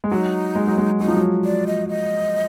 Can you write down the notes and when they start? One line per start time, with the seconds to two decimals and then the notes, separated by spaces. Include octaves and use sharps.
0.04 G#3
0.11 F#3 D#4
0.55 G#3
0.67 F#3
0.78 G#3
1.00 F#3 D#4
1.08 F3
1.17 F#3
1.45 D5
1.67 D#5
1.89 D#5